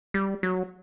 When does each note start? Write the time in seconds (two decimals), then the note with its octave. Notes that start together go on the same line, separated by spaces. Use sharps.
0.14 G3
0.43 F#3